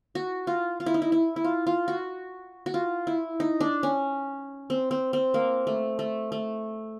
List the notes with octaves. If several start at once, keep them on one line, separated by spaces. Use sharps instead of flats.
F#4
F4
F4
E4
D#4
E4
E4
E4
F4
F4
F#4
F#4
F4
E4
D#4
D4
C#4
C4
C4
C4
A#3
A3
A3
A3